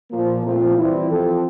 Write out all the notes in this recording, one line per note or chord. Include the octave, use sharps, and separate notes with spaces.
A#2 F3 A#3
A#2 F3 A3 C4 F4
E3 G3 C4 E4
F3 C4 F4 A4